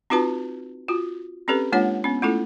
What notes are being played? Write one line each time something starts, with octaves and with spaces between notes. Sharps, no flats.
C4 D#4 F4 F#4 B4 A5
F4 F#4
C4 C#4 G4 A4 B4
G#3 A#3 D4 F4 C#5 F#5
B3 C#4
A3 C#4 E4 F4 A4